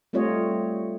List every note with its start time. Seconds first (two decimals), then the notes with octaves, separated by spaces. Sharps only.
0.13 G3 A3 C4 F4 C#5 D#5